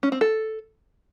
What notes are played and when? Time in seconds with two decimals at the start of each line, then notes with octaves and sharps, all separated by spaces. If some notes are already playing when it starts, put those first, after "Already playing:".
0.03 C#4
0.12 C4
0.21 A4